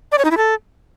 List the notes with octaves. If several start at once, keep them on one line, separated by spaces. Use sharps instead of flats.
D5
C#5
D#4
E4
A4